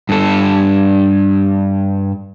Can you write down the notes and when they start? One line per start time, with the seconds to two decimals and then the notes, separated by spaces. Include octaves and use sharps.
0.09 G2 A4